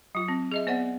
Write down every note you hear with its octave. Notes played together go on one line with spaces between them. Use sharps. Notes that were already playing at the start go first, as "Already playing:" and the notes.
F#3 F4
C4
G#4 D#5 E5
B3 C5 D5 F#5